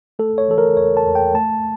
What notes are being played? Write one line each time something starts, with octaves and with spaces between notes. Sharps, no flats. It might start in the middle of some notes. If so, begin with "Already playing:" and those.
A3 A4
C#5
E3 A4
A#4
E2 C#5
A5
E2
G5
A3 A5